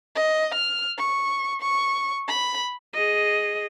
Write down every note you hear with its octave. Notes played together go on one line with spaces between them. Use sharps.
D#5
F6
C#6
C#6
B5
G#4 D#5